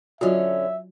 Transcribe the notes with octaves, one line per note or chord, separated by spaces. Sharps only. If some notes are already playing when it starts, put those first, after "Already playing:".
D3 F#3 C#4 F4 F#4 E5